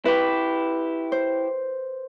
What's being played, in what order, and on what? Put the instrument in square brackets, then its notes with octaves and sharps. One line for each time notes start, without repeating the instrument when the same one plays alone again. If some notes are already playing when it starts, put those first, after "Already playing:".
[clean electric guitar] E4 G4 [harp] B4
[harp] C5